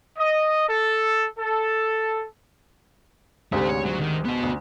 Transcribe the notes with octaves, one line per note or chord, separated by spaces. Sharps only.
D#5
A4
A4
D2 G#2 C3 A3
C#5
F#3
D#3
B3 F#4
D2